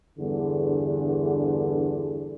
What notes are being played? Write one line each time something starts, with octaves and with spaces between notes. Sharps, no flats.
E2 G2 D3